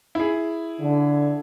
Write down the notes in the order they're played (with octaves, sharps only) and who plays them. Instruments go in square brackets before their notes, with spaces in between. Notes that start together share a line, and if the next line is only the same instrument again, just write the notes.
[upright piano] E4 G#4
[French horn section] D3